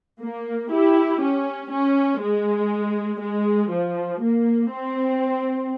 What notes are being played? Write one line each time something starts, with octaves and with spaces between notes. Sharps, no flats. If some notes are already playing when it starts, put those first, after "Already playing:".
A#3
E4 G4
C#4
C#4
G#3
G#3
F3
A#3
C4